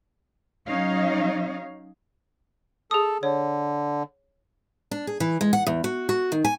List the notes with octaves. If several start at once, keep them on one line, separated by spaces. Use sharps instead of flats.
F#3 C#4 D#4 C#5 D#5 F5
G#4 A4 D#6
D3 C#5
D4
G#4
E3
G#3
F#5
E2
F#4
F#4
D#3
G#5